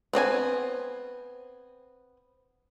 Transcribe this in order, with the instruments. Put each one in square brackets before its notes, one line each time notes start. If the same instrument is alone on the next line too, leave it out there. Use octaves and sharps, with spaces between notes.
[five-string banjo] B3 C4 D5 G#5